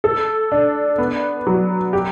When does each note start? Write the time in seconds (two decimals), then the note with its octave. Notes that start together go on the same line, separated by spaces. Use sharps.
0.04 A4
0.52 D4
0.98 B3
1.47 F#3
1.93 G4